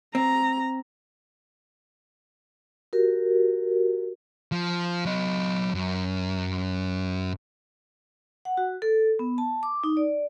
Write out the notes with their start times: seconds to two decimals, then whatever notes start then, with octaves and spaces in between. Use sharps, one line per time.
0.15 C4 A#5
2.93 F#4 G4 A#4
4.52 F3
5.05 F#3 D#5
5.75 F#2
8.45 F#5
8.57 F#4
8.82 A4
9.19 B3
9.38 A5
9.63 D6
9.84 D#4
9.97 D5